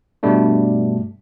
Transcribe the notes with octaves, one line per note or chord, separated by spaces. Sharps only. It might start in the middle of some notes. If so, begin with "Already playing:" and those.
G2 B2 G3 A3 D4